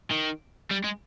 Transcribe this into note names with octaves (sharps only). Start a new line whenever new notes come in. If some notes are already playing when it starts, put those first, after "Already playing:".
D#3
G3
G#3